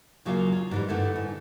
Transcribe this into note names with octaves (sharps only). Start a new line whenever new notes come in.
D#2 C#3 F#3 A#3 F4 F5
F4
G#2 E3 G3
G2 D3 A3 D#4 E4
G#2